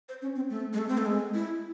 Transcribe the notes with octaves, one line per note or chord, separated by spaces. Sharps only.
C5
C#4
C4
A3
G#3
A3
C4
A3
G#3
E4